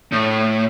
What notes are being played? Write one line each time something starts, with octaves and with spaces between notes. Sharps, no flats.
A2